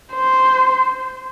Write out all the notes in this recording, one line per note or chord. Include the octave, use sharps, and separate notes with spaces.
C5